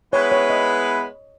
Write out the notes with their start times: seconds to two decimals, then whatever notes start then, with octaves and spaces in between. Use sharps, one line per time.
0.12 G#3 B3 E4 B4 C#5
0.32 C#5
0.50 D#5